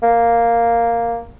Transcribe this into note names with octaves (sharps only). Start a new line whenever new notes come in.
A#3